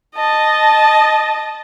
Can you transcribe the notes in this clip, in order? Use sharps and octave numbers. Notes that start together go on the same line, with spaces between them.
D#5 A5